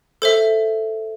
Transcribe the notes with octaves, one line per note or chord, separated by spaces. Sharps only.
A4 C5 E5